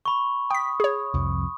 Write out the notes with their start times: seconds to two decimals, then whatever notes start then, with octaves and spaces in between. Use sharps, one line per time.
0.06 B5 C#6
0.50 G5 D#6 B6
0.80 G#4 C#5
1.14 C2 F2 F3